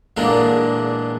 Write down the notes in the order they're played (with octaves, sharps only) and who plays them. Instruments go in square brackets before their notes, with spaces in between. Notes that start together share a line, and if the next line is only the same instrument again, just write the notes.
[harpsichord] E2 A#2 D3 G#3 A#3 D4